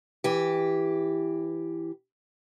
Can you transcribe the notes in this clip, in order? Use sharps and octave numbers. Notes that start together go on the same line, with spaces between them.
E3 G4